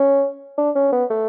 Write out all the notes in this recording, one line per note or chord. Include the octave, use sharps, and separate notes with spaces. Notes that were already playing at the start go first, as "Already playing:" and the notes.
Already playing: C#4
D4
C#4
B3
A3